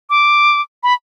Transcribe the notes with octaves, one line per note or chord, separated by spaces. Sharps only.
D6
B5